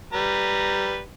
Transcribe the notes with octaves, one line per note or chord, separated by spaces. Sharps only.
G3 B4 A#5